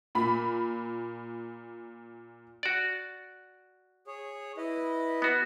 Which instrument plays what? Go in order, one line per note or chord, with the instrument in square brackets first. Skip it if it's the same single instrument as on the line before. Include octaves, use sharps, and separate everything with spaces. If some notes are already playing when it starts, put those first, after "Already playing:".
[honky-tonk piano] A#2 B5
[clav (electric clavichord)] F#4 D5
[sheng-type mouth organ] G#4 C#5
E4 B4 D#5
[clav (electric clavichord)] B3 F#4